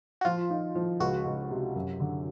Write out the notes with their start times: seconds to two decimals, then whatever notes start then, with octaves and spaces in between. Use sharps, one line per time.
0.21 F#4
0.25 F3 F4
0.50 D#4
0.75 F3
1.00 C#2 F#4
1.25 C#2
1.51 C3
1.75 F#2
2.00 D3